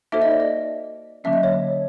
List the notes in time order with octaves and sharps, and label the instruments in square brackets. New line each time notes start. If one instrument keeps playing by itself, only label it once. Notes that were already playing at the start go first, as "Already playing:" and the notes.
[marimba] A#3 D#4 F#4 A4 C5 [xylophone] E5
[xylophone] D#5
D5
D#5
[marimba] D3 F#3 A#3 C#4 [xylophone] E5
[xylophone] D#5
C#5